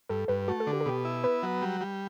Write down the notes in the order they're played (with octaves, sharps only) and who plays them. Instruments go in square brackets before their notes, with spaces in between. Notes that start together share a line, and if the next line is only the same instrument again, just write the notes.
[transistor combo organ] G2 [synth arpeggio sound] A4
[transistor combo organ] G2 [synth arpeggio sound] B4
[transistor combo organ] A3 [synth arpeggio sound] F#4
[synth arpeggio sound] A4
[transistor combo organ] D3
[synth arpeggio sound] G4
A4
[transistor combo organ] B2 [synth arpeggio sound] G4
[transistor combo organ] E4
[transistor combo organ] B3 [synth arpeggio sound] B4
[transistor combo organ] F#3
G3
G3